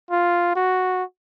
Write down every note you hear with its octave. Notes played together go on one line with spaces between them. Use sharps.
F4
F#4